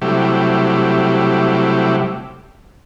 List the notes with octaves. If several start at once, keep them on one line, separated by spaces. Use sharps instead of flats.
C3 F#3 G3 A3 E4 G4